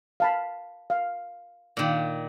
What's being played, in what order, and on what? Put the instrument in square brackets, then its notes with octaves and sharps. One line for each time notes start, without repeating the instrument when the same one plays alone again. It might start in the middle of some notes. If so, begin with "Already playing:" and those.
[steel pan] F5 A5 B5
F5
[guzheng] A#2 D#3